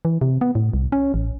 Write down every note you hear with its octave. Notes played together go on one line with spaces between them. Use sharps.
E3
C3
B3
A2
C2
C#4
A1